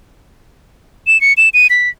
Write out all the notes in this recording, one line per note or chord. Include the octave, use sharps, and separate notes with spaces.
E7
C#7
E7
D#7
B6